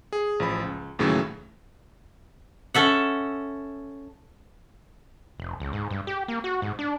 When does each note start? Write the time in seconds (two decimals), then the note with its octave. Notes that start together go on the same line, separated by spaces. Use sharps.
0.13 G#4
0.40 A1 F3 B5
0.64 C#2
0.99 D#2 A2 C#3 E3 F#3 A3
2.74 C#4 A4 E5 F#5
5.39 F1
5.60 C#2
5.73 G#2
5.91 G2
6.07 G4
6.28 A#3
6.44 F#4
6.62 G#2
6.79 D4